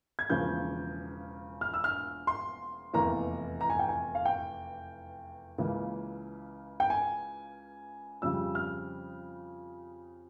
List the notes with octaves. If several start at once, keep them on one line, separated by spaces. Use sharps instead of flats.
G#6
E1 E2 C#3 F3 A#3 G6
F6
E6
F6
C6
F1 E2 E3 A#3 A#5
A#5
G#5
G5
G#5
F5
G5
C#2 C#3 E3 A#3
G5
G#5
F2 C#3 G3 E6
F6